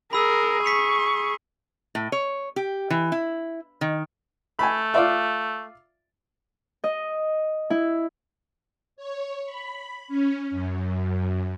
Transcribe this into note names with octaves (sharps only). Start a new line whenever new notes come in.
G#4 A#4 B5 E6 B6
C#6 B6 C#7 F7
A2
C#5
G4
E3
E4
D#3
A3 G#5 B5
F4 D5 E5
D#5
E4
C#5
B5
C#4
F#2